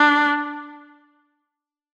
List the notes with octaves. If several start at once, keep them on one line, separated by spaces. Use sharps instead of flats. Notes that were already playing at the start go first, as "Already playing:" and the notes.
Already playing: D4